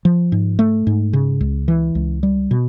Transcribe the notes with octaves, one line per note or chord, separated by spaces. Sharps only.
F3
G#2
A3
G#2
C#3
C#2
E3
C#2
G3
B2